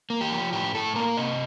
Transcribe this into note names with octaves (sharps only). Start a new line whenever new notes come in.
A#3
G4
F3
A2 G4
A2 A4
A#3 A#4
C3 D#5